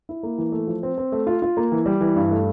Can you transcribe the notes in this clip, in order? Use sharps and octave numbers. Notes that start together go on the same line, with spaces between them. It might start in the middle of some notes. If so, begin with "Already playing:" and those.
E4
A#3
E3
A3
F3
C4
C4
A3
F4
F4
A#3
E3
G3
E3
G2
A3